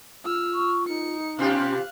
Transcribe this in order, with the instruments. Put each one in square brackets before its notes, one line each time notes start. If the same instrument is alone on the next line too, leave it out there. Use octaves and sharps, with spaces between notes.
[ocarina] F4 [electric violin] E6 F6
[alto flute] C#6
[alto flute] D#4 [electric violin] C#7
[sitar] B2 F4 G4 [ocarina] C#4 [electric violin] F5 F#6